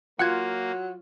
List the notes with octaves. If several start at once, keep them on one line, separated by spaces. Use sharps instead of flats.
F#3 A#3 F4 C#5 F#5 F#6 G#6